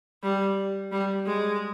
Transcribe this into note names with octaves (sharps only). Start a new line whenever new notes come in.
G3
G3
G#3